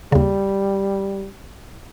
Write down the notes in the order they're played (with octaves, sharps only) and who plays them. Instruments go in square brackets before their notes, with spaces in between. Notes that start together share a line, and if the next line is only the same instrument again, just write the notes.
[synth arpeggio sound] D#2 C#3 [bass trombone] G3